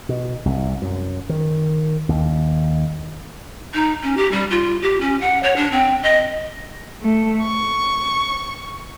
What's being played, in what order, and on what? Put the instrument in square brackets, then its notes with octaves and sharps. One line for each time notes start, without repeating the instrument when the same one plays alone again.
[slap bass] B2
C2
F#2
D#3
D#2
[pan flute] D#4
C#4
G4
G3
F4
G4
C#4
F#5
C#5
D4
C4
D#5
[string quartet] A3
C#6